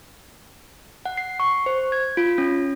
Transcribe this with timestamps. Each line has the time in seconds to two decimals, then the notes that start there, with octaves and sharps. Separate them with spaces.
1.05 F#5
1.17 C7
1.40 C#6
1.66 C5
1.92 G#6
2.17 F4
2.38 C#4